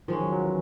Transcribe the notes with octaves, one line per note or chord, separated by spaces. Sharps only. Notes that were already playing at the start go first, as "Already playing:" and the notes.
D#3 F3 G#3 C#4
F#3
F#3
E3